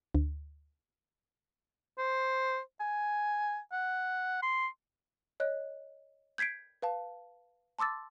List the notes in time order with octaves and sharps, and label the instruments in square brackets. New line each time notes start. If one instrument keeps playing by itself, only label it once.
[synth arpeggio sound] D2
[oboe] C5
G#5
F#5
C6
[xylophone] C#5 D#5 F#6
G6 G#6 B6 C7 D7
B4 F5 A5
A5 C6 D6 E6 A6